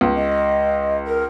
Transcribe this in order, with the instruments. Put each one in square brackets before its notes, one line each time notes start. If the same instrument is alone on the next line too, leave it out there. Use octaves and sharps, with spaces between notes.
[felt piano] C#2
[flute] D#5
A#4